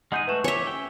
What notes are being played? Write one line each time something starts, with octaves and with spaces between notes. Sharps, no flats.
G#3 D#4 G#4 F#5 G6 D#7
A3 F#4 B4 E7
G4 C#5 E5 G#5
C#4 G5